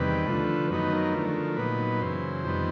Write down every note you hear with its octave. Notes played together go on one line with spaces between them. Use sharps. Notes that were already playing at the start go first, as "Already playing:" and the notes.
Already playing: E2 C3 D#3 G3 B4
D3 F3 A3
F#2 D#3 F#3 B3 D#4 B4
A#4
D3 F3 A3
A#2 F#3 B3 D#4 B4
F#2 C#3 E3 C5
F2 C3 D#3 G3 B3